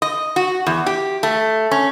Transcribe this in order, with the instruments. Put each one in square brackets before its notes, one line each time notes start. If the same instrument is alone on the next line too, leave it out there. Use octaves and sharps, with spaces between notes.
[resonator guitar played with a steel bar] D#5
F#4
E2
G4
A3
C#4